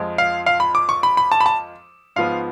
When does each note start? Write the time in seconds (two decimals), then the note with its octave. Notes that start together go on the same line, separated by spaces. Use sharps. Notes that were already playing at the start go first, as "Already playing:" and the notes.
Already playing: F2 F3 G#3
0.18 F5
0.46 F5
0.60 B5
0.75 D6
0.89 C#6
1.03 B5
1.17 B5
1.32 A5
1.41 B5
1.46 A5
2.16 G#2 F3 B3 F5